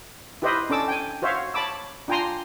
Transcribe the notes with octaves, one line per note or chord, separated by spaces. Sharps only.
E4 G4 B4 C5 D#5 E5
C#4 D4 A4 D6 E6
G5 G#5
F#4 C5 C#5 E5 F5
C#5 A5 B5 D6 E6
D4 F4 G5 G#5 A#5 C6